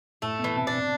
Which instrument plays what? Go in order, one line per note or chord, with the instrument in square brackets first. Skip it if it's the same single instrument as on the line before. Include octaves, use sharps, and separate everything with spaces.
[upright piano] A2 [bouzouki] A3
[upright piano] B2
[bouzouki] E3
[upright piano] C3
[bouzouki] D4
[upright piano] C3